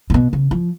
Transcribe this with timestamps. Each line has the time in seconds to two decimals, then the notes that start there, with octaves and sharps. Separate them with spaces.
0.10 A2
0.14 B2
0.33 C#3
0.51 F3